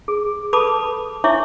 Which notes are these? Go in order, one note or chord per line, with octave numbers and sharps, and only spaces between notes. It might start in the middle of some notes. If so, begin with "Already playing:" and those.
G#4
A4 B4 A5 B5 D6 D#6
E4 C#5 E5 G#5 C#6 D6